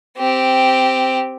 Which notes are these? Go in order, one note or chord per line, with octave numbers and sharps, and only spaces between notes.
C4 G4